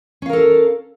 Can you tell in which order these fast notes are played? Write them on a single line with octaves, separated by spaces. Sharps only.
C#4 F5 A#4 A4